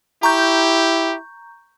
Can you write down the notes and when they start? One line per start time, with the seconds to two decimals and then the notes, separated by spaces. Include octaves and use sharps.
0.23 E4 G4 A#5 C#6 G6